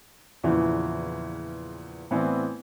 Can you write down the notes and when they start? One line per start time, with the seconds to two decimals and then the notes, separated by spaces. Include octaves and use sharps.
0.44 E2 A#2 C#3 E3 F3
2.11 A2 E3 B3 C4 D5 G#5